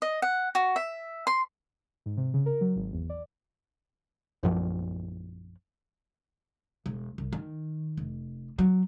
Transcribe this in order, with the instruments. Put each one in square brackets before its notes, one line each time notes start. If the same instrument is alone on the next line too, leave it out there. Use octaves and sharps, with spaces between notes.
[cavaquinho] D#5
F#5
F#4
E5
C6
[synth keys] G#2
C3
C#3
A#4
F#3
G#1
E2
D5
[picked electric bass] A#1 F#2 F3
[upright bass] E1
C2
D#3
F1
F#3